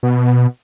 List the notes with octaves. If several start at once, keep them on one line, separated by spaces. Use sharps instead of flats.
B2